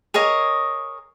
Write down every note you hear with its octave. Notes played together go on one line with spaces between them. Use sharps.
G#4 A#4 C#5 D#5